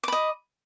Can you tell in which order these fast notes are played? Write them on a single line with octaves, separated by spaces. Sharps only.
D6 B5 D#5